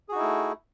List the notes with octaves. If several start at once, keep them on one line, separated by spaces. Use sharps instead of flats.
A3 D#4 E4 F#4 G#4